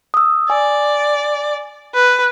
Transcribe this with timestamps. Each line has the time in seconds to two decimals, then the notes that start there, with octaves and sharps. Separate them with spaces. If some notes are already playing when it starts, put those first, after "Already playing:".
0.14 D#6 E6
0.50 D5 G#5
1.94 B4